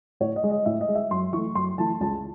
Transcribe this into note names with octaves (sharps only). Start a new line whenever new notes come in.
A2 C#5
D#5
G#3
D#5
A2 E5
D#5
G#3
E5
F#2 C6
E3 A3 C#6
F#2 C6
E3 A3 A5
C#2 A5